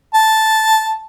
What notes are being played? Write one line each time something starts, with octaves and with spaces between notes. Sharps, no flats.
A5